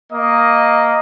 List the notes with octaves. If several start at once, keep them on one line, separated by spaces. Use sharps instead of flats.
A#3 D#5